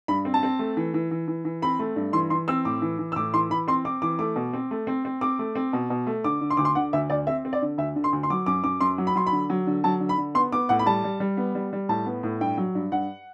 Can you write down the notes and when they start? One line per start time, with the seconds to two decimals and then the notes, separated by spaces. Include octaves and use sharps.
0.08 G2 B5
0.25 C4
0.34 A5
0.43 C4
0.59 A3
0.77 E3
0.94 E3
1.11 E3
1.28 E3
1.45 E3
1.62 C4 B5
1.79 A3
1.96 G2
2.13 E3 C6
2.30 E3 C6
2.48 C4 E6
2.65 A2 D6
2.82 E3
2.99 E3
3.12 E6
3.16 A2 D6
3.34 E3 C6
3.50 E3 B5
3.68 C4 C6
3.85 C4 D6
4.02 E3 D6
4.19 A3 D6
4.36 B2
4.53 C4
4.71 A3
4.87 C4
5.05 C4
5.21 C4 D6
5.39 A3
5.55 C4
5.73 B2
5.90 B2
6.07 A3
6.24 D3 D6
6.41 D3
6.50 C6
6.57 D2 D6
6.65 C6
6.75 D3 F#5
6.93 D2 E5
7.10 D2 D5
7.27 C4 E5
7.45 C4
7.53 D5
7.62 D3
7.78 D2 E5
7.96 D3
8.04 C6
8.13 D2
8.23 C6
8.30 F#3 D6
8.46 F#2 D6
8.64 F#2 D6
8.81 F#2 C6
8.98 F#3
9.07 B5
9.15 F#3 C6
9.27 B5
9.32 D3
9.50 F#3
9.67 D3
9.84 F#3 A5
10.00 D3
10.09 B5
10.18 D3
10.35 B3 C6
10.52 B3 D6
10.69 A2 F#5
10.79 B5
10.86 G3 A5
11.04 G3
11.20 G3
11.37 B3
11.55 G3
11.73 G3
11.89 A2 A5
12.06 B3
12.23 A2
12.41 G2 G5
12.58 F#3
12.75 G2
12.92 G2 F#5